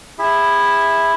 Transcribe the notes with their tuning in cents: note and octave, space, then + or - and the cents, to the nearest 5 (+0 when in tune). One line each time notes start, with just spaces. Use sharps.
E4 +0 G#4 -40 E5 -5